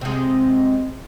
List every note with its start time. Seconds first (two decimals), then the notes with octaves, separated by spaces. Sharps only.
0.01 C3 G#3